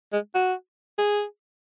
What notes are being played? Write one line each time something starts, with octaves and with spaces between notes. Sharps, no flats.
G#3
F#4
G#4